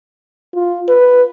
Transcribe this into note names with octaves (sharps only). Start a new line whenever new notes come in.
F4
B4